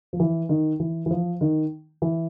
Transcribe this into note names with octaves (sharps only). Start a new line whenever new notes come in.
F3
E3
D#3
E3
E3
F3
D#3
E3